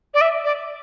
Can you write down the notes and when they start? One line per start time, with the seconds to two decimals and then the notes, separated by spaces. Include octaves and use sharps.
0.14 D5
0.21 E5
0.45 D5